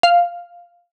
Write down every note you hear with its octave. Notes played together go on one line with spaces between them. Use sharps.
F5